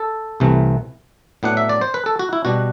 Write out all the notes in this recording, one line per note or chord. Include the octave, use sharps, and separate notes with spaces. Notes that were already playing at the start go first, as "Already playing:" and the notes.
Already playing: A4
C2 C3 E3 A3
A2 F#3 B3 D4 F#5
E5
D5
C5
B4
A4
F#4
E4
B2 G3 B3 D4 F#4